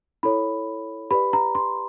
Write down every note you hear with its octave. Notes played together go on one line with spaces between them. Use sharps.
E4 A4 C#5 B5
G4 B4 D5 B5
A#5
C6